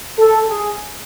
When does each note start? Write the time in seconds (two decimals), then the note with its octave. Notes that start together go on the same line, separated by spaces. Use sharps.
0.19 A4
0.48 G#4